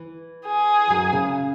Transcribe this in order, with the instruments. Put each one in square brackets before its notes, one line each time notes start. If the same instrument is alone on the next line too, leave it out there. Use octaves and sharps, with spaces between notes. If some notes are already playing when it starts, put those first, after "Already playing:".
Already playing: [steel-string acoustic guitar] E3
[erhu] G#4
[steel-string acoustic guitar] F#2 F#3
C#3 C#4